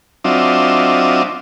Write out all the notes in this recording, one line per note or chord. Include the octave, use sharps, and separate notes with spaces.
F#3 C4 D4 F4 D#5 E5